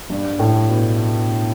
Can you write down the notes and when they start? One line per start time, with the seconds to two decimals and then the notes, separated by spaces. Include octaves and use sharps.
0.10 G2 G3
0.39 A2 A3
0.69 B2 B3